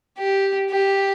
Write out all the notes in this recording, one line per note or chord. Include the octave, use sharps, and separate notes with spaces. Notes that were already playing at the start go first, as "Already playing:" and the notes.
G4
G4